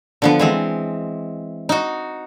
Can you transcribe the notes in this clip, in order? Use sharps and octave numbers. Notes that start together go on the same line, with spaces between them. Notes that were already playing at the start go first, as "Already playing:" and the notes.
D3 F3 B3
E3 G#3 C4
D#4 F#4